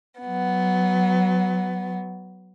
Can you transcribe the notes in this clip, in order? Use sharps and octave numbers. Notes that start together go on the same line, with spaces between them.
F#3 B3